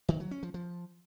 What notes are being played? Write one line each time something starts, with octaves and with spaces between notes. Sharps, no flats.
D#3
F#3
C#4
F3
F3